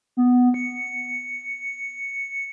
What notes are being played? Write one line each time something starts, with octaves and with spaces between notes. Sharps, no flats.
B3
C#7